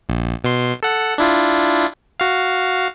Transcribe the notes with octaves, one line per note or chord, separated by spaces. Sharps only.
A#1
B2 C6
A4 F#5
D4 E4 F4
F#4 F5